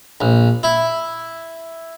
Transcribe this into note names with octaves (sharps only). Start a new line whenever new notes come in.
A#1
E4